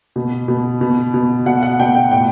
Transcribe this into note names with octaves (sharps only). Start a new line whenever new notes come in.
B2
B2
B2
B2
B2 F#5
F#5
B2 G5
G5
A2 G5